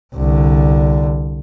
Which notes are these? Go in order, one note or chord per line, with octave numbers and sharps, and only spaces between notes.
C2 D3